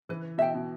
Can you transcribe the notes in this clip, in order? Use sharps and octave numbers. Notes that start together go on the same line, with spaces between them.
E3 B4
B2 E5 G5
B2